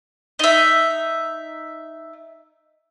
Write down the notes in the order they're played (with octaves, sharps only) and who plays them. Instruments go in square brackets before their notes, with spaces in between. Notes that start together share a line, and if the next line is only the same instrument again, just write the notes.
[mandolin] D#4 E5